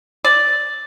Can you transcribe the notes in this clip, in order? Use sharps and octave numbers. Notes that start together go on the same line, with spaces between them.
D5